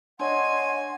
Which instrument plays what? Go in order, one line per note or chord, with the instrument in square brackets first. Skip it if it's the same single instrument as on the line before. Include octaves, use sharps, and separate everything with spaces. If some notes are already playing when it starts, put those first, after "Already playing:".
[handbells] D4 C#5 D#5 [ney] F#5 [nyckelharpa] G#5 [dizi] C6